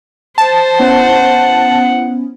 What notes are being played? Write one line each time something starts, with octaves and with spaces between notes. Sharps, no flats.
C5 A5
B3 C#4 E4 F#5